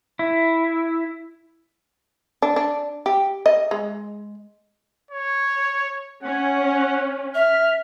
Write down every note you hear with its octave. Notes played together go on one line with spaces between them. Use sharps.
E4
D4
D4
G4
D#5
G#3
C#5
C#4 F#5
E5 F6